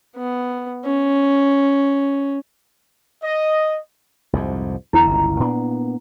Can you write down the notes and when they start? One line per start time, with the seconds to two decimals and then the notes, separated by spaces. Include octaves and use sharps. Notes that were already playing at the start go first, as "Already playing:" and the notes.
0.16 B3
0.85 C#4
3.24 D#5
4.33 C2 F2 G#2
4.93 E2 D3 E4 A#5
5.07 G1 C#2
5.40 A#2 B3 D4